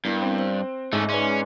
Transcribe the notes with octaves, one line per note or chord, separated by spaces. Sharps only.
G2 B3 E4 A#4
C4
C5
G#2 A3 C#4 E5
C#4 B4 D5 C6